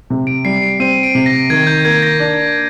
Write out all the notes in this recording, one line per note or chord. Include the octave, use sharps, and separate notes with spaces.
C3
D7
G3 C7
D7
C4 D#7
D7
C3
A#6
D#3 G#6
G6
A#3 G#6
A#6
D4